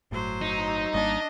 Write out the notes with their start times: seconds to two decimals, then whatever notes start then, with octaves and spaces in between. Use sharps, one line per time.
0.11 G1 A2 F#3 C5
0.42 D#4
0.94 G#1 G3 A#3 D4 D#5